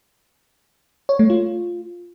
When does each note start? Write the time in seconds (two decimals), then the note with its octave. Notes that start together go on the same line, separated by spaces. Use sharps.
1.09 C#5
1.19 A3
1.30 F4